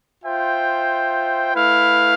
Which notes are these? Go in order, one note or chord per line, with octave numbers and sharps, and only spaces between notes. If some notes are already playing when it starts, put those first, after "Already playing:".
F4 C5 E5 G5
A3 E4 B4 F5